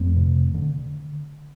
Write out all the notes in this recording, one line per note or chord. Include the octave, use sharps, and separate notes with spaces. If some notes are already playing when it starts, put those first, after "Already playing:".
Already playing: F2 A3 C4
C3
D3